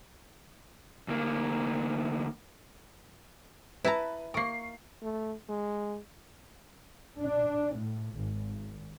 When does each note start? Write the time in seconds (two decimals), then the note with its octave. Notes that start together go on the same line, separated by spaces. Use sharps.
1.08 D2 A#3
3.85 E4 B4 A5 A#5
4.34 A#3 A#4 C#6 C7
5.02 A3
5.49 G#3
7.20 D4
7.76 A2
8.18 G#1